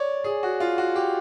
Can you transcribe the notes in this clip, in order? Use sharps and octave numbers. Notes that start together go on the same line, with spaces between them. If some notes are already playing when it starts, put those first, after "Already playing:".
Already playing: C#5 D5
G#4
F#4
F4
F#4
G4